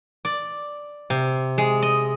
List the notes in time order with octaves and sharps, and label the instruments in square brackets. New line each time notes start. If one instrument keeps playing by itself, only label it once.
[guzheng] D5
C3
G#3
D#5